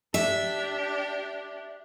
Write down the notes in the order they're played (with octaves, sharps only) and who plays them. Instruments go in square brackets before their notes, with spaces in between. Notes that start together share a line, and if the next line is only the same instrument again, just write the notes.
[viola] D4 G4 [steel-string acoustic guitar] E5